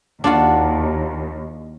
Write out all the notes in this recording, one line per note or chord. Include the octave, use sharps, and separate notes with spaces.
D#2 D4 F4 F#4